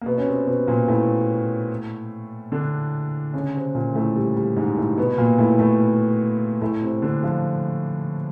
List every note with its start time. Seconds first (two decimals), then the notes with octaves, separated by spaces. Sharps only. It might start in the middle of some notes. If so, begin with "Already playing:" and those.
0.01 A#3
0.06 B2 B3
0.18 C#4
0.27 C3 C4
0.47 B2 B3
0.67 A#2 A#3
0.88 A2 A3
2.52 D3 D4
3.33 C#3 C#4
3.54 C3 C4
3.75 A#2 A#3
3.95 A2 A3
4.16 G3
4.36 G3
4.56 G#2 G#3
4.77 A2 A3
4.97 B2 B3
5.18 A#2 A#3
5.38 A2 A3
5.59 A2 A3
6.62 A2 A3
6.82 C3 C4
7.02 D3 D4
7.23 F3 F4